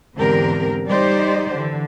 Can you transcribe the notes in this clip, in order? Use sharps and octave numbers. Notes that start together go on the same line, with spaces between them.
E2 G#2 D3 C4 G4 A#4
G3 D#4 G4 C5 D5
D3 E3